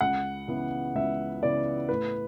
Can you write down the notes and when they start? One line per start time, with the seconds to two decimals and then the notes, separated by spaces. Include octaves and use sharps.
0.01 C#2 F#5
0.48 C#3 E3 B3
0.95 C#2 E5
1.43 C#3 E3 B3 D5
1.89 A2 B4